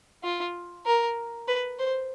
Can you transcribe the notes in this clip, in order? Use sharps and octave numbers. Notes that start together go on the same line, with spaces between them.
F4
A#4
B4
C5